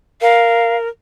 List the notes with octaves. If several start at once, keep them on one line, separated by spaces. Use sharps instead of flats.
A#4 F5